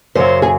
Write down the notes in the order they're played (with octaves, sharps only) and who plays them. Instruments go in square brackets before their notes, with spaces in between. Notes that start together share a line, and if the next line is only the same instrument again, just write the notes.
[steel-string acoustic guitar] F#2 C#3 F#3 C5
G#4